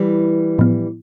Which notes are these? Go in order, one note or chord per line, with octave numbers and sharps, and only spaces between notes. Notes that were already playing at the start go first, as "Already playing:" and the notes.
Already playing: E3 G3
A2 F3 B3